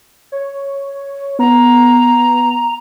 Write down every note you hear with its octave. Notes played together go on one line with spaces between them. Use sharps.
C#5
B3 A#5